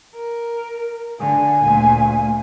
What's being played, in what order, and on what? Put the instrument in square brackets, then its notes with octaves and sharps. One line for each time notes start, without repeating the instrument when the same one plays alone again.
[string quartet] A#4
[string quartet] D3 [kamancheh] G#5
[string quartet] D2 A#2